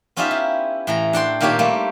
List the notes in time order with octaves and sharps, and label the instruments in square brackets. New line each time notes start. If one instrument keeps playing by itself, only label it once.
[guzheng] B3 C#4 D#4 F4 G4 E5
E4
A2 E3 A#5
D4 F#5 G5 C6
A#2 D#3 A#3 C4 G4 C#5
G3 A3 A#3